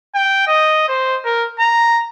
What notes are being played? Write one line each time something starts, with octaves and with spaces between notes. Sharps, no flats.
G5
D#5
C5
A#4
A#5